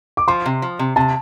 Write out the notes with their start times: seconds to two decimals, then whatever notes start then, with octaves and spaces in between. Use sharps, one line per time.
0.17 D6
0.28 F3 C6
0.46 C3
0.62 F3
0.79 C3
0.96 C3 A5